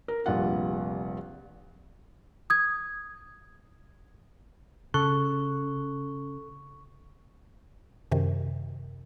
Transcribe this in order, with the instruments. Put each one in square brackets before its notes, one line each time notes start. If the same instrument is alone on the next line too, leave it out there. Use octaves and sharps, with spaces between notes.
[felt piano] A#4
F1 A#1 G3 F4 F#5
[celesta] D#6 G#6
[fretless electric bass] C#3 [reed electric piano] A4 F#6 [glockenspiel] C#6
[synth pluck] F#2 C3 D#3